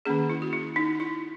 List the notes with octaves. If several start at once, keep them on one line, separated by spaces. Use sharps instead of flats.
D#3 A#3 C#4 G#4
E4
F#4
E4
D#4
E4